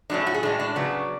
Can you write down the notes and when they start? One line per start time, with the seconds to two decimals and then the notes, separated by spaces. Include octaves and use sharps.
0.10 A2 F#3 A3 C#4 D4
0.27 F#4
0.34 G#4
0.43 A2 G#3 C#4 D4
0.60 D4
0.76 C#3 F#3 B3